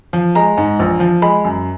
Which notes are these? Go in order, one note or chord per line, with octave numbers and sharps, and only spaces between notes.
F3
G#3 A#5
G#2
A#1
F3
G#3 B5
F#2